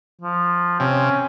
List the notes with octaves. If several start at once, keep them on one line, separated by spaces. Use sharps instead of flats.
F3
C3 C#4